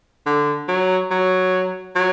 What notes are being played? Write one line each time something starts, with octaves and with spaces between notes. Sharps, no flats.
D3
F#3
F#3
F#3